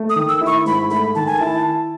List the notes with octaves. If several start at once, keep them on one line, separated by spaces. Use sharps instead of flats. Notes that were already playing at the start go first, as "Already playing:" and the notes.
Already playing: A3
D#6
D#3
E6
E4
C#6
G#2 B5
A3 B5
D#3 A5
G#5
E4 A5